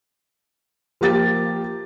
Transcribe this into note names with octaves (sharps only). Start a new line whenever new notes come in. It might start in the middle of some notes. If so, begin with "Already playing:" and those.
F3 A#3 G4 A6